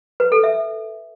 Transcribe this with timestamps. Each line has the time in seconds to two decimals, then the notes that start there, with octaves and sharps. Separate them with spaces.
0.20 B4
0.32 A4
0.44 E5